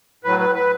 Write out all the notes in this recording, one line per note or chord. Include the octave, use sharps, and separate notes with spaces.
A2 F#3 B4
B4
B4